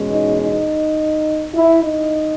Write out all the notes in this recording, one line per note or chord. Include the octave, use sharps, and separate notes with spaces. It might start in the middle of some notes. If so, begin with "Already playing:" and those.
Already playing: E2 B2 G#3 C#4
D#4
D#4
E4
D#4